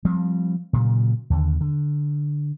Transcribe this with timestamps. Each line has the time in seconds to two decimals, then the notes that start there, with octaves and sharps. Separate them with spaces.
0.05 F3 G3 C4
0.73 A#2 C#3 F#3
1.30 D#2 D3
1.61 D3